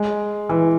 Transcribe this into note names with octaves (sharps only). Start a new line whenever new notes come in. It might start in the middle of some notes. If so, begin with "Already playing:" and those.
Already playing: G#3
E3